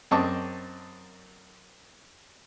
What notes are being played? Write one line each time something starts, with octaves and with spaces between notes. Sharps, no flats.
F#2 C4 D#5 A5 C#6 D6